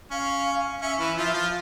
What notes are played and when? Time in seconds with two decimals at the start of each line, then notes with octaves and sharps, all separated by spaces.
0.11 C#4 F5
0.81 C#4 E5
0.99 E3 E4
1.17 F3 F4
1.34 F3 F4